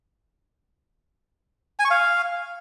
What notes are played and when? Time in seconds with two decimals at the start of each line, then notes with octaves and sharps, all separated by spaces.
1.79 G#5
1.85 C#6
1.90 F5